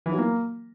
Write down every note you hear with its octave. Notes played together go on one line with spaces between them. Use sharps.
E3
F#3
A#3